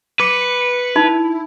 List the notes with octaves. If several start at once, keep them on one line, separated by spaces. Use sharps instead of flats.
B4 D6 C#7
D#4 E4 B5